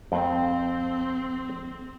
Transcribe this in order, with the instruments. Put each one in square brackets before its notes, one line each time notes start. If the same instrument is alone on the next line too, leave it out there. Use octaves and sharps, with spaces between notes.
[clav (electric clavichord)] F2 G5 [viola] C4